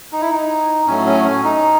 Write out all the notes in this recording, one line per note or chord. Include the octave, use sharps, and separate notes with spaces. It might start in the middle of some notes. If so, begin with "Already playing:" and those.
D#4
E4
D#4
A2 F#3 A3 C#4
C#4
C#4
D#4